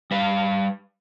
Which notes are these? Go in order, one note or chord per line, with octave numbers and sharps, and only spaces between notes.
G3 B4 F5